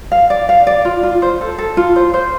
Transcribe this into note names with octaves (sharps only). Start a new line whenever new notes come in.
F5
D5
F5
D5
F4
F4
C5
A4
A4
F4
C5
C5